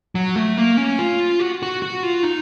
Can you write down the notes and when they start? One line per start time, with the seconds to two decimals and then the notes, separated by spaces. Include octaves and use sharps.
0.15 F#3
0.36 A3
0.57 A#3
0.77 C#4
0.99 F4
1.40 F#4
1.63 F#4
1.82 F#4
2.03 F4
2.23 D#4